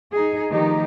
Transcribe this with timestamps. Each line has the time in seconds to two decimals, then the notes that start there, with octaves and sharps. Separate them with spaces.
0.12 D#4 G#4
0.51 D#3 F3 A3 D#4 G4